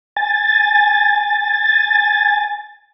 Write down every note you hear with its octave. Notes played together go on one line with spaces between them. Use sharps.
G#5 A6